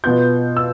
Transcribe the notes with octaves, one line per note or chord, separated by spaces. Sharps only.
B2 B3 F4 G6
E6